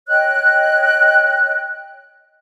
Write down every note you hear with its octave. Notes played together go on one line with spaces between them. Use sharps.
C#5 D#5 G5 F#6